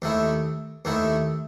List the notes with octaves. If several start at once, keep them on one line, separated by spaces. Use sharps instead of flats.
D#2 D#3 A3 E4
D#2 D#3 A3 E4